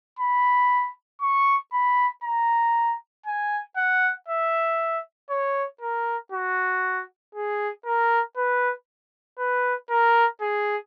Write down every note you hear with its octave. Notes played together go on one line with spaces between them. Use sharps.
B5
C#6
B5
A#5
G#5
F#5
E5
C#5
A#4
F#4
G#4
A#4
B4
B4
A#4
G#4